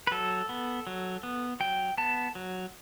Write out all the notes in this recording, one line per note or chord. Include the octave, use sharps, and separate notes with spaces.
B4
F#3 A4
B3
F#3
B3
F#3 G5
B3 A5
F#3